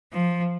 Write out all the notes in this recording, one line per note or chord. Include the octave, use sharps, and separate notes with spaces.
F3